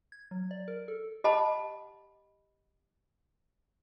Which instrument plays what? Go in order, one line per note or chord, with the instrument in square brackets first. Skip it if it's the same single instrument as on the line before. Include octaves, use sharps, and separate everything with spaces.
[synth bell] G#6
F#3
D5
A#4
A4
[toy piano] G4 D#5 F#5 A5 B5